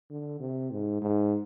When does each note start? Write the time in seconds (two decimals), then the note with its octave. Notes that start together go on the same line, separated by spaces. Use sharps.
0.10 D3
0.40 C3
0.71 G#2
1.02 G#2